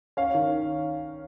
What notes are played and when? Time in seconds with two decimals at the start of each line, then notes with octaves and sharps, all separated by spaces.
0.17 C#4 F5
0.34 D#3